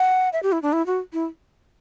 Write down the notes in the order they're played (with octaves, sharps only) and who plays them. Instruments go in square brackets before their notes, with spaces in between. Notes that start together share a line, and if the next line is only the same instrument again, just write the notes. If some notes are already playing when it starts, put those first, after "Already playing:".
Already playing: [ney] F#5
E5
G4
E4
D4
E4
F#4
E4